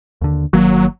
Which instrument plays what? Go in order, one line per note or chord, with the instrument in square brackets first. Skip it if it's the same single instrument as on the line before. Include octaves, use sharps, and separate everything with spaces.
[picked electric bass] D#2 D3
[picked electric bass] G1 D#3 A#3 [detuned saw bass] F#3